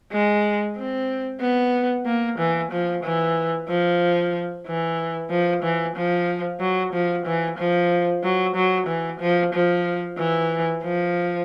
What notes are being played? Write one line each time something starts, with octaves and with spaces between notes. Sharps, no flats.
G#3
C4
B3
A#3
E3
F3
E3
F3
E3
F3
E3
F3
F#3
F3
E3
F3
F#3
F#3
E3
F3
F3
E3
F3